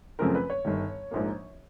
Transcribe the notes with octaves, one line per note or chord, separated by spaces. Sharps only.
F#2 C#3 F3 A3 C4 A#4
B4
C#5
G1 G2 D#3
A#1 G#2 F3 A#3